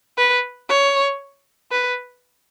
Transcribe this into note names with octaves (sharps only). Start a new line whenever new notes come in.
B4
C#5
B4